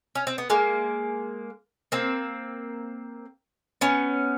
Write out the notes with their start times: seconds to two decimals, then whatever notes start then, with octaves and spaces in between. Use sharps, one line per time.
0.15 C#4
0.27 C4
0.38 B3
0.50 G#3 A#3
1.92 A#3 C4
3.81 B3 C#4